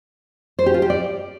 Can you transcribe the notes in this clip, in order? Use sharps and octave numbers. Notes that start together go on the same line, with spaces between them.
C5
G4
F4
G4
D5